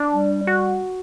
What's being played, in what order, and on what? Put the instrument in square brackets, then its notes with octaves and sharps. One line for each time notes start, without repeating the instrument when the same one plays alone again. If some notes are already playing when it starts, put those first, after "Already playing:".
Already playing: [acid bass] D4
[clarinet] G3
[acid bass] F#4